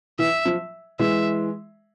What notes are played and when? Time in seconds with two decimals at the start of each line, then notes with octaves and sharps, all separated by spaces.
0.19 E3 E5
0.45 F3
0.99 E3 G#3 E5